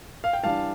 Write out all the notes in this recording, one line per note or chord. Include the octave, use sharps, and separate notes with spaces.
F5
G5
E3 G3 D4 F5 A5